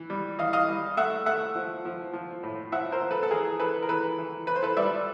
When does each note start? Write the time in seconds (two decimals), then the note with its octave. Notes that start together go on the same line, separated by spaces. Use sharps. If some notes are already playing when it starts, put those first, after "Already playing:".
Already playing: E3
0.10 G3
0.39 E3 D#5 F5
0.53 D#5 F5
0.68 G3
0.97 A3 E5 F#5
1.26 A3 E5 F#5
1.55 F3
1.85 F3
2.13 F3
2.43 A2
2.72 F3 E5 F#5
2.92 A#4 C5
3.02 F3
3.11 A4 B4
3.23 A4
3.31 E3 G#4 A#4
3.60 E3 A4 B4
3.83 A#4
3.89 E3 A4 B4
4.18 E3
4.47 E3 B4
4.56 C5
4.63 A4 B4
4.77 G3 D5 E5